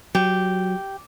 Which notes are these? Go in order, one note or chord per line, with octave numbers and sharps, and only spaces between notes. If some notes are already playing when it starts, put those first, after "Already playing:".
F#3 G4